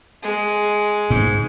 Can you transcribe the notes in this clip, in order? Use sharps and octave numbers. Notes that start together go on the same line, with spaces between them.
G#3
G#2